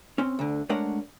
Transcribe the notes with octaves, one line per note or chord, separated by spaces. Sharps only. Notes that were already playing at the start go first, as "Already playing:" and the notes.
C4 C#4
D2 D3
G#3 A3 D4 A#4 C#5 F#5